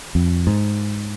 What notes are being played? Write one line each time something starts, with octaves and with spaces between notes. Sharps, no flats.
F2
G#2